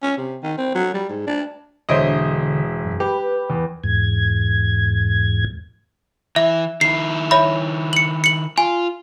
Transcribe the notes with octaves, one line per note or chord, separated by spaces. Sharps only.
C#4
C3
D#3
C4
F#3
G3
G#2
D4
E1 D3 C5 C#5 D#5 E5 D7
F#2
G4 B4
E2
E2 G#2 G#6
E3 E5
D#3 E4 C7
C#5 E5 B5
C#7 F#7
C#7 F#7
F4 G#5